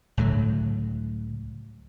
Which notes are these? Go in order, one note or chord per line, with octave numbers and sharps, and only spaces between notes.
C#2 A2 D3 F#3